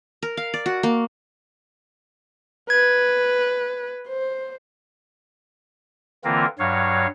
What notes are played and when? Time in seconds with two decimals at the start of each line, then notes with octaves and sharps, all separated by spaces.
0.23 A#4
0.37 F5
0.54 D5
0.66 F#4
0.83 A#3
2.70 B4 G#6
4.08 C5
6.25 D3 E3 A#3 C4 F4 A#4
6.59 G2 F#3 C#5 F5